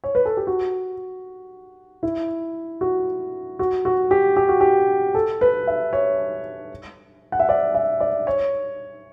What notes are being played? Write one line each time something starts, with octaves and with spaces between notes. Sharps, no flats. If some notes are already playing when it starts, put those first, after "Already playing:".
C#5
B4
A4
G4
F#4
E4
F#4
F#4
F#4
G4
G4
F#4
G4
A4
B4
E5
C#5
F#5
E5
D5
E5
D5
C#5